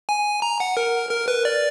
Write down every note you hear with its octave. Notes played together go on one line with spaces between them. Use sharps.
G#5
A#5
F#5
A#4
A#4
B4
D5